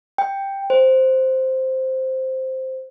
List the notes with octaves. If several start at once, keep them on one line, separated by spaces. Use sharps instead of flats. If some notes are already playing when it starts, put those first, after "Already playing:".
G5
C5